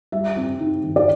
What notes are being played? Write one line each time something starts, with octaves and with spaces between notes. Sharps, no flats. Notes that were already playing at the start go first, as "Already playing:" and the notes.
G3 E5
C4
D#4
D#3
D5